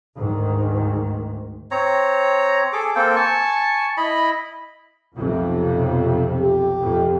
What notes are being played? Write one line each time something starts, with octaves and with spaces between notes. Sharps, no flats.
D2 G#2 D#3
C4 C#5 A#5
G#4 A4 D6
A#3 C4 A4 G5
G#5 A5 C#6
E4 D#5 B5
B1 F2 C3
G4
F2 C3